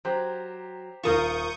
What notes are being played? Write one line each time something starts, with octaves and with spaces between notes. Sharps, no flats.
F#3 G4 C5 A#5
D#1 F4 A#4 C#6 D#6 G6 E7